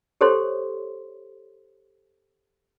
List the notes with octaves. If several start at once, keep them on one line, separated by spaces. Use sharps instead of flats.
G4 A4 C5 C#5 C6